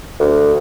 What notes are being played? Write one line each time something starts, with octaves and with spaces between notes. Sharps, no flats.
D2